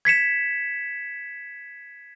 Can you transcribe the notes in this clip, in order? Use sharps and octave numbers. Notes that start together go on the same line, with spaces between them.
G#6 B6 C#7 E7